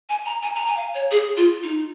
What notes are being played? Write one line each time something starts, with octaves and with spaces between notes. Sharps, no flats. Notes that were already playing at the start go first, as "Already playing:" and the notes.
G#5
A#5
G#5
A#5
G#5
F5
C#5
G#4
F4
D#4